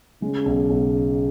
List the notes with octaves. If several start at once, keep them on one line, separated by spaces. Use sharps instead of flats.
C#3 G#3
B1
B1